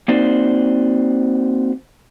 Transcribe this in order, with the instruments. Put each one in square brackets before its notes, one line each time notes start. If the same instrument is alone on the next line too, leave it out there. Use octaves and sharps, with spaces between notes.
[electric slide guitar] A#3 C4 D#4 F#4 C5 D5